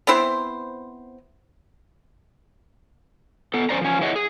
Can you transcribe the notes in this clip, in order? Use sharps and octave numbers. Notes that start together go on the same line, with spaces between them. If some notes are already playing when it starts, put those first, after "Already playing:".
B3 C4 E4 C5
B3 A4
F2 C#4 C5 D5 A#5
F3 C#4
E4 G#4 C#5 D#5 F#5
G#4